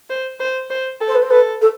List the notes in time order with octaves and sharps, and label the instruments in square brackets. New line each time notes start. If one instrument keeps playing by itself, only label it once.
[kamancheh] C5
C5
C5
A4
[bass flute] C5
B4
C5
[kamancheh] A4 [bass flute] B4
[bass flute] A4